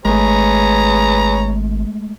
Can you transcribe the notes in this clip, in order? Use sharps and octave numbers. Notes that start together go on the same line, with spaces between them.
G#1 G#3 A3 G#4 B4 C#5 A#5